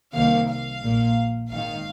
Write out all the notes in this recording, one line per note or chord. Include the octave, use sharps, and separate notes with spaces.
C2 C3 D#3 A#3 F5
F5
A#1 A#2 A#3
G#1 G#2 D#3 F5